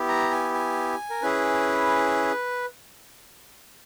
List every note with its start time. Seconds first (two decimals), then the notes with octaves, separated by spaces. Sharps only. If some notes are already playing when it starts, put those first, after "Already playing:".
Already playing: B3 E4 G4
0.08 A#5
0.31 G#5
0.54 G#5
1.10 A#4
1.22 C#4 E4 G#4 B4